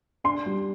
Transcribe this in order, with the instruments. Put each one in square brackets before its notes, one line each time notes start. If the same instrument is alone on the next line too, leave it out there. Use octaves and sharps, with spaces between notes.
[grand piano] D4 [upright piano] C6
[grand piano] G3